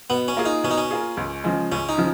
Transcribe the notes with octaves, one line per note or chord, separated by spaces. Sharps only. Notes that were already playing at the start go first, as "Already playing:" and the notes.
B2 B3
C#4
A#3 F4 G#4
D#4
B2 C#4
D#4
C#4
A#3 F4 G#4
C#2
C#3 F3 G#3
C#2 C#4
D#4
C#3 F3